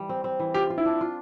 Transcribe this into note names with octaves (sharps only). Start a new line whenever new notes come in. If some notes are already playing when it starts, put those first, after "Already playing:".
Already playing: E3 G3
C4
C4
E3
F4 G4
F4
E4
D4
F4